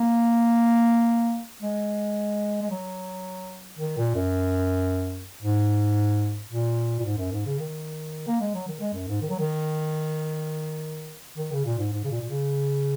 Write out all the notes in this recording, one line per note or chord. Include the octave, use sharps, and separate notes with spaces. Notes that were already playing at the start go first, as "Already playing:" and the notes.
Already playing: A#3
G#3
G#3
F#3
D#3
A#2
F#2
G#2
A#2
A#2
G#2
F#2
G#2
C#3
D#3
A#3
G#3
F#3
D#3
G#3
F#2
G#2
D#3
F#3
D#3
D#3
C#3
A#2
G#2
G#2
C#3
A#2
A#2
C#3